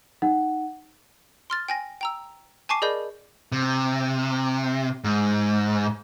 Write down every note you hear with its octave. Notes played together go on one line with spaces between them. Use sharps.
D#4 F#5
C6 F6 A6
G5 G#5 A#6
G5 A#5 E6
G#5 A5 C#6 D6 C7 D#7
G#4 A#4 D5 D#5 B5 G6
C3
G#2